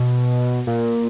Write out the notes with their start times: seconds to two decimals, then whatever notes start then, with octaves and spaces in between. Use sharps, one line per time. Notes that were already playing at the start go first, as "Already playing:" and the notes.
Already playing: B2
0.67 A#2